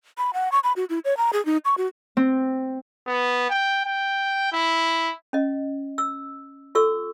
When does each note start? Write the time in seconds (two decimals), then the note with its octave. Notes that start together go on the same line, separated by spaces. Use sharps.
0.18 B5
0.34 F#5
0.52 C#6
0.64 B5
0.76 F#4
0.90 E4
1.05 C#5
1.17 A#5
1.33 G#4
1.46 D#4
1.65 C#6
1.78 F#4
2.17 C4
3.07 B3
3.50 G5
3.85 G5
4.52 E4
5.33 C#4 D#5
5.98 E6
6.75 F4 A4 C#6 E6